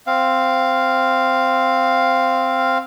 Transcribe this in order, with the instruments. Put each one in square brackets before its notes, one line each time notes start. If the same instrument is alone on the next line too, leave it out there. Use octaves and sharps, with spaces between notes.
[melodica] C4 F5